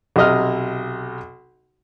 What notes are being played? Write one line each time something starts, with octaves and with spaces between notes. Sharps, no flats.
B1 C3 D#5 F6